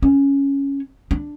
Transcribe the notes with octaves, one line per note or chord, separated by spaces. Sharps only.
C#4
D4